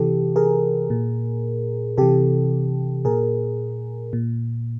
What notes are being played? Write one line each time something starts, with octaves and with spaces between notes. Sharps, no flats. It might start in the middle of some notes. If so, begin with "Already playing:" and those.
Already playing: C3 E3 G4 A4
G#4 A#4
A#2
C3 E3 G4 A4
A#2 G#4 A#4
A#2